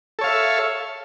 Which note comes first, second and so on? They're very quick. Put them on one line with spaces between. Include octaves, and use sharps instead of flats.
A4 C#5 F5 E5